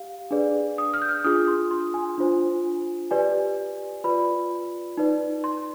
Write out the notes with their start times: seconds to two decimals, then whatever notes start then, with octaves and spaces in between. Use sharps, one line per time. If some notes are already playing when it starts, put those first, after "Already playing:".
Already playing: G4 F5
0.31 D4 G#4 B4 D5
0.78 D#6
0.94 F6
1.02 G6
1.09 F6
1.24 D4 F4 G#4 D#6
1.48 C6
1.71 C6
1.94 G#5
2.18 D4 F4 C5
3.11 G4 B4 D5 G#5
4.04 F4 B4 D5 B5
4.97 D#4 B4 D5
5.44 C6